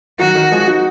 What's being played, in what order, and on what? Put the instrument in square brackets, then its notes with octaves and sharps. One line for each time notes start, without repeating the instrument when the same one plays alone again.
[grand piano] D#3 F#3 [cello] F#4
[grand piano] D#3 F#3
F3 G#3
D#4 F#4